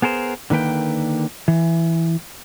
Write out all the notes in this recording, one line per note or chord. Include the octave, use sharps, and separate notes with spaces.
B3 G#4 A#4 C5
D3 D#3 A#3 B4 G5
E3